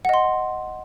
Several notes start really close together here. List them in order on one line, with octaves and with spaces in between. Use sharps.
F#5 D#5 C6